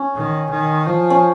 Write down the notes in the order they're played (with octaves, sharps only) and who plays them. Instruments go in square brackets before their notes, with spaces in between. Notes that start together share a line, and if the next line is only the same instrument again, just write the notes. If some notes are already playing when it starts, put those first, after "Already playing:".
Already playing: [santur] C#4
[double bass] D#3
D#3
F3
[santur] C#4